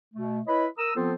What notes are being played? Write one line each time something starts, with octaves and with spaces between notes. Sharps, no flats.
B2 A3
E4 B4 C#5 D#5 B5
A#4 A#5 D#6 E6
F3 B3 C4 F4 A4 C5